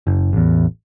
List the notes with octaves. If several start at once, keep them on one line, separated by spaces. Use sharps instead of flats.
F#1
A1 E2